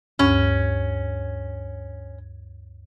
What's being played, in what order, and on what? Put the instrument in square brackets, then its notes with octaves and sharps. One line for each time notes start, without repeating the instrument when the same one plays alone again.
[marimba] D2 G2 C#6 [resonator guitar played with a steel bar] C#4